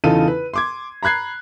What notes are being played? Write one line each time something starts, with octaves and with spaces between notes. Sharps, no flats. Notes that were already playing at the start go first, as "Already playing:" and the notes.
E2 C#3 D#4 F4 A4 D#7
B4
C6 D6 G#6
A#5 B5 F#6 G#6 C7